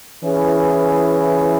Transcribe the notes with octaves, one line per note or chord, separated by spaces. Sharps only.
E3 C#4 E4 G#4 B4